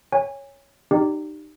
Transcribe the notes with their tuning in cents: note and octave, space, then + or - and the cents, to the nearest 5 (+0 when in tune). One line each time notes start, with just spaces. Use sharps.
C#5 +0 G#5 -25
D#4 -25 G4 -15 D5 +0